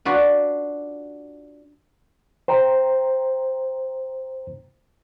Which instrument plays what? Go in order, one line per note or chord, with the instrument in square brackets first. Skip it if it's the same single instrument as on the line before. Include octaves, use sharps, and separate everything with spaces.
[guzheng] D4 F4 F#4 B4
[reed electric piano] C5 G5 A#5